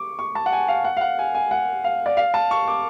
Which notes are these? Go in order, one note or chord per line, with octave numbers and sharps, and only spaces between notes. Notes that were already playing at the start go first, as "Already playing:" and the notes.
Already playing: C#6 D6
C#6
A5
F#5
G#5
F5
F#5
F5
F#5
G#5
G#5
F#5
F5
D5
F5
A5
C#6
D6